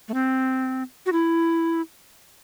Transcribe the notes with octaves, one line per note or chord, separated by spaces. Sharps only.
A3
C4
F#4
E4